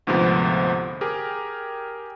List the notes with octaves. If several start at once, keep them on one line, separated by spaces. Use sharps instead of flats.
D2 G#2 C3 F3 B3
G4 G#4 A#4